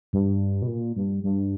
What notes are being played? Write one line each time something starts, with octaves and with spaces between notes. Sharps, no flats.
G2
B2
A#2
G2
G2